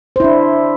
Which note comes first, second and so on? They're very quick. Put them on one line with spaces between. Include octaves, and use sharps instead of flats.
C5 E4 D4